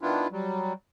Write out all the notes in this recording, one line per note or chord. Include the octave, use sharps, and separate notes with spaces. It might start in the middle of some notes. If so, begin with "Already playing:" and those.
D#3 B3 D4 E4 F4
F#3 G3